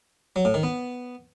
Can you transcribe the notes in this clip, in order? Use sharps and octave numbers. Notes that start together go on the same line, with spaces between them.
F#3
A2
D#3
B3